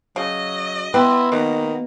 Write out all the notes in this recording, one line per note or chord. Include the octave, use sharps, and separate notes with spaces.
C#3 F#3 D#5
B3 E4 B4 G5 C6
B2 D#3 A#3